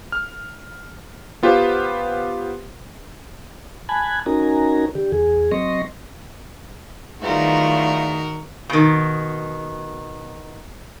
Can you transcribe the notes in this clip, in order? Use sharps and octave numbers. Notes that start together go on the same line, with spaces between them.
F6
B3 F4 G4 B4 C5
G#5 A5 B5 F#6 G#6
C#4 D#4 F#4 A#4 G#5 A#5
D3 G4
E2 G#4
F#3 C4 D#5 C6 C#6 A#6
E2 D#3 G3 A3 F4 F#4 A#4
B2 D#3